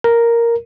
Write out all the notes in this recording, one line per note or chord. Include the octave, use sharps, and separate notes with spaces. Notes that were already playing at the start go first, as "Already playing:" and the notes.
A#4